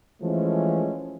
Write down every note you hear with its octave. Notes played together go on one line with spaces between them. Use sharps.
E3 F3 G#3 A3 C#4